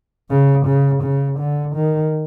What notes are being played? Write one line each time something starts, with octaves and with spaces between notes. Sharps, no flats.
C#3
C#3
C#3
D3
D#3